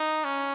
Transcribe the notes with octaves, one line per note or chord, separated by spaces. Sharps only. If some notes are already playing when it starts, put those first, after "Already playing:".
Already playing: D#4
C#4